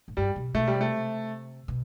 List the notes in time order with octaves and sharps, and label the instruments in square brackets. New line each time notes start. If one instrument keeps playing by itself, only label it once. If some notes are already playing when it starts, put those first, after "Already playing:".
[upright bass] A2
[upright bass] G2 [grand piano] G3
[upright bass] B2
[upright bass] B2 [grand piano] A3
[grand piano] G3
[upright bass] C3
[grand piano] A3
[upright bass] B2